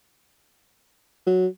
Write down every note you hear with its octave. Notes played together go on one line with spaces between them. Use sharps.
F#3